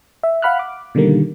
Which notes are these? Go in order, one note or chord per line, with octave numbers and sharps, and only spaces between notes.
E5
F5 F#5 B5 F6 F#6
D6
B2 D3 D#3 G3 A#3